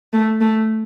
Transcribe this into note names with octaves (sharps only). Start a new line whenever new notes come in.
A3
A3